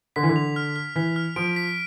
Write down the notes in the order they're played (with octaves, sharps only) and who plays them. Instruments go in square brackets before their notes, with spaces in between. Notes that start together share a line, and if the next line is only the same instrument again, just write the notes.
[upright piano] D3 [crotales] B6
[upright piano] E3
D3
[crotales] F7
F6
F6
[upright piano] E3 [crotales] B6
[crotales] F6
[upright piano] F3 [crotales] D7
[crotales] B6